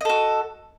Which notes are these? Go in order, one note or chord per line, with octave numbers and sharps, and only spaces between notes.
F#4 A4 D#5